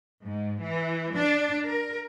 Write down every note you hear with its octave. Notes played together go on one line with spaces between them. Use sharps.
G#2
E3
D4
A#4